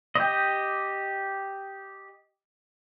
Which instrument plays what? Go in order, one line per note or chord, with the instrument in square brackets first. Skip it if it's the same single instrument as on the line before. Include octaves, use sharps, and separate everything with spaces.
[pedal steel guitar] G4 D#5